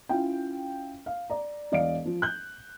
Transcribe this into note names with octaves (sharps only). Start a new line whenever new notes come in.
C#4 E4 F4 F5 G5
F5
D5 A#5
E1 D5 D#5 F5 D7
F3
F#6 G6